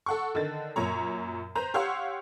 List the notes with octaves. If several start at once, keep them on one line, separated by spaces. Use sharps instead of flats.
A4 F#5 C#6
D3 D#3 A6
F#2 A#2 C#5 A#5
B4 C5 A#5 G6
G4 C#5 F5 F#5 C6 E6